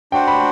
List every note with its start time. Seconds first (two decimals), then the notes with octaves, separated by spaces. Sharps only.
0.12 D4 F#4 C5 F#5 G5
0.28 B5